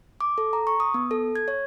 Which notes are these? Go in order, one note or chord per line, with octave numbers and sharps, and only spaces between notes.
D6
A4
A#5
C#6
D#6
B3
A4
G#6
C#5